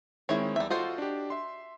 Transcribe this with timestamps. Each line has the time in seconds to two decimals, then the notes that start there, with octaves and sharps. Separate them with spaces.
0.29 D#3 G#3 C4 E4 C#5
0.56 E2 G3 E5
0.70 F4 F#4 A4 C5 D#5
0.98 D4 G4
1.30 E5 C6